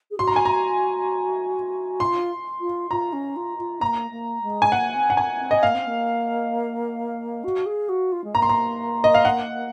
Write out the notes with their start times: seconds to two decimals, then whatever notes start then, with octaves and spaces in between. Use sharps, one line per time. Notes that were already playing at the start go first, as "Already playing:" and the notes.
0.11 G#4
0.19 F#4 C6
0.27 A#5
0.36 G#5
0.45 A#5
2.00 F4 C6
2.61 F4
2.91 F4 A#5
3.13 C#4
3.36 F4
3.58 F4
3.81 A#3 A#5
4.11 A#3
4.42 G#3
4.62 G#5
4.72 A#3 F#5
4.95 C4
5.10 F#5
5.17 C4 G#5
5.40 C4
5.51 D#5
5.62 A#3 F5
5.75 C4
5.87 A#3
7.44 F#4
7.66 G#4
7.89 F#4
8.12 F4
8.24 G#3
8.34 A#3 A#5
8.42 C6
8.49 A#5
9.04 D#5
9.14 F5
9.25 F#5